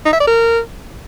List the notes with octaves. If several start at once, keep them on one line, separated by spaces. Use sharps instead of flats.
D#4
E5
D5
A#4